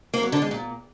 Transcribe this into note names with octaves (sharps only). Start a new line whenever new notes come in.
A#3
F#3
D3
G#3
A#2